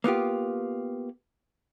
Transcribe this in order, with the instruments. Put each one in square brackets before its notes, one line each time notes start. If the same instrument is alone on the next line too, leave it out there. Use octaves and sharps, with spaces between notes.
[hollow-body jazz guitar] A#3 B3 F4 G4